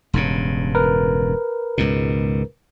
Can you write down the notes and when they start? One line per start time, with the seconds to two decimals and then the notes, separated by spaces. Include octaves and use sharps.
0.13 E1 G2 C#3
0.75 A#4 B4
1.78 C#2 G#2 B2